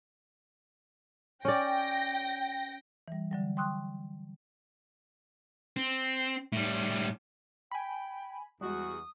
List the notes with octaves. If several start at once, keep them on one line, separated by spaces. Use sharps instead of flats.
C#4 D5 G5 A#6
E3 G3
D3 F#3 G3
G5 C6 C#6 D#6 E6 F#6
C4
A2 G3
G5 G#5 B5
E2 G3 G#3 F#4 D#6